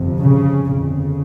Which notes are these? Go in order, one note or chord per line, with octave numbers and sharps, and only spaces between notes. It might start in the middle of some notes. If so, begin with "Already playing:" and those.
Already playing: G1 F2 C3
C#3
G1 F2 C#3